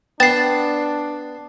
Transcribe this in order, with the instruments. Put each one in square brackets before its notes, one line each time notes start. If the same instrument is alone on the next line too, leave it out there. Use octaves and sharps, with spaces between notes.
[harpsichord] B3 [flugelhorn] D4 [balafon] G5 [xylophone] A6 C7